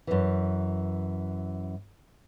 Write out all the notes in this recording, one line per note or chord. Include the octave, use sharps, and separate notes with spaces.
F#2 E3